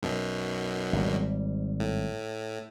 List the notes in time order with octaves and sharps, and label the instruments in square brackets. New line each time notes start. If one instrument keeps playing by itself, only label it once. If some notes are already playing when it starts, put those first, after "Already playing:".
[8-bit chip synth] B1 F#2 B2
[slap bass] G#1 G3
[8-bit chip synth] A2